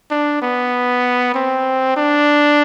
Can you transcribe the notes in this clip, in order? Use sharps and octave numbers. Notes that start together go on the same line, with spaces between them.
D4
B3
C4
D4